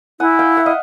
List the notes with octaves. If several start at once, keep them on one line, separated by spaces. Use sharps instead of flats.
E4 F#5 G#5
F5 G5
E5 F#5
D#5 F5